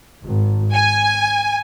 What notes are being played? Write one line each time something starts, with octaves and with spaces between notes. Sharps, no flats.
G#1
G#5